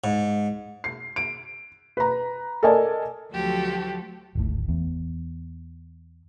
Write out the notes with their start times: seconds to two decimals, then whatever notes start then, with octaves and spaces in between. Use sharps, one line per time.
0.04 G#2
0.84 C7
1.16 D7
1.97 B4 A#5
2.63 A4 A#4 D5 D#5 G#5 A5
3.30 D2 F3 F#3 F#4 G4 A4
4.35 D1 G#1 A2
4.69 E2